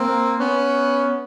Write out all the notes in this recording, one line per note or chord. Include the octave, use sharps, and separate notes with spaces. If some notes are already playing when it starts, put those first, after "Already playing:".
Already playing: A#3 C4
B3 C#4